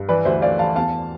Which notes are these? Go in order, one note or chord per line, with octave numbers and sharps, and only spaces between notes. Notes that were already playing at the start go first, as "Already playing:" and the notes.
Already playing: G2
E3 B4 D5
D2 C5 E5
A3 D5 F5
E3 F5 A5
E2 F5 A5